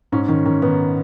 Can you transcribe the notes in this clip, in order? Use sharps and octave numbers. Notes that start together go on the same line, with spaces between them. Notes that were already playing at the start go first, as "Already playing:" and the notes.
G#2 C#4
D#3 C#4
D#3 C#4
D#3 B3